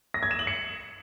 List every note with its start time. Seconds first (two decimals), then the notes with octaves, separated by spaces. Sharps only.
0.14 A#6
0.23 G#6
0.31 E7
0.39 F#7
0.47 C#7